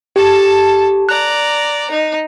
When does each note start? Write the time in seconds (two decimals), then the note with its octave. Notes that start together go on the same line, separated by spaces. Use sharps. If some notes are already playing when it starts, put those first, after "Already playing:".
0.16 G4 A4 A5
1.09 D5 A#5 F#6
1.91 D#4